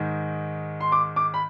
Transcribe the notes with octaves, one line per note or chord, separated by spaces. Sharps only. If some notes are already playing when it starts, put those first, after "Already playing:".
Already playing: G#2 D#3
C6
D6
D6
B5